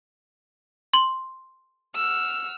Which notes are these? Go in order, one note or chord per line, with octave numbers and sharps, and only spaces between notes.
C6 F#7
F#5 E6 F6